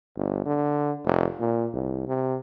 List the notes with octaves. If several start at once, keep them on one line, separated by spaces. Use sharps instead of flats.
G1
D3
F1
A#2
C2
C3